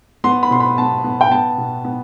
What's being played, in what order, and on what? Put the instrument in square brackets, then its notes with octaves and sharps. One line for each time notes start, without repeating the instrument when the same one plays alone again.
[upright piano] B3 C6
B5
B2 C6
B5
B3 A5
B3
G5
B3 A5
B2
B3